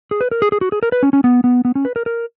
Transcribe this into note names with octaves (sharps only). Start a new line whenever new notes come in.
G#4
B4
A#4
G#4
G#4
F#4
G#4
A#4
B4
C#4
C#4
B3
B3
B3
C#4
B4
A#4
A#4